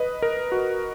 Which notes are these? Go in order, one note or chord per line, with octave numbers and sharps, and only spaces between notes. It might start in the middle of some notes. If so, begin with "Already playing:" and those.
Already playing: B4 D#5
A#4
F#4